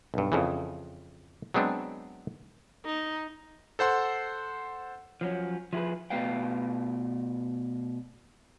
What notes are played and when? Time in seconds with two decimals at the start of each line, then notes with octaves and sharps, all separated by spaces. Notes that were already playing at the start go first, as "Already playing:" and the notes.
0.14 B1 G2
0.32 F2 C#3 E3
1.54 F#3 G#3 B3 C4 D4
2.85 D#4
3.79 A4 C5 F#5 C6
5.21 F3 F#3 C#4
5.73 F3 E4 G4 G#4 B4
6.10 B2 A3 B4 F5 G5